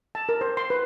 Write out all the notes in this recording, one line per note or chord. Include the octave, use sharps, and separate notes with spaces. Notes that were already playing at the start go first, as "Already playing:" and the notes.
A5
A#4
C5
C6
B4